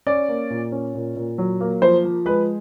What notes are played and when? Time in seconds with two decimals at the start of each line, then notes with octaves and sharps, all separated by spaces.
0.07 C#4 D5
0.29 A#3
0.50 A#2
0.72 C#4
0.94 A#2
1.16 A#2
1.38 F#3
1.61 A#3
1.82 F3 C5
2.04 F3
2.26 G#3 B4